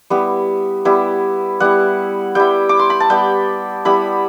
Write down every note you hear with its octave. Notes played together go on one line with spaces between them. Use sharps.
G3 B3 E4
G3 B3 E4
G3 B3 E4 F#5
G3 B3 E4 G5
D6
C6
B5
A5
G3 B3 E4 G5
G3 B3 E4 B5